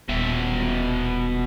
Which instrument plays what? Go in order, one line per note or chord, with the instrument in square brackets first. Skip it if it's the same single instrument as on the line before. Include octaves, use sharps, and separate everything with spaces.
[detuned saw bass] D#1 [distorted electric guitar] B2 E5